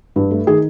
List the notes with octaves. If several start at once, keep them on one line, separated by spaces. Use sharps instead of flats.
G2
A3
D#3 G#4